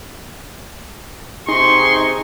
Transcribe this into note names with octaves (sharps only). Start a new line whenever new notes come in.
C3 D#4 G#4 C6 C#6